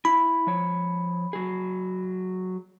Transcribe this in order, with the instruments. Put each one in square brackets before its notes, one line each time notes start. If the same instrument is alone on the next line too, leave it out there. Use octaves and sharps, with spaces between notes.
[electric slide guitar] E4 [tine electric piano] B5
[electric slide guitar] F3 C#5
F#3 G#4